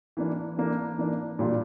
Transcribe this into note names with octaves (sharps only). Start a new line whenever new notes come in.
E3 A#3 D4
E3 A#3 D4
E3 A#3 D4
A#2 G3 D4 F4